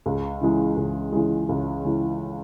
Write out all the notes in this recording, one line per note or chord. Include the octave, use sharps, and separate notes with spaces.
C#2
C#3 E3 G#3
C#2
C#3 E3 G#3
C#2
C#3 E3 G#3